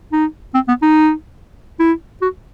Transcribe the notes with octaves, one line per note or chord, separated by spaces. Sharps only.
D#4
C4
B3
D#4
E4
F#4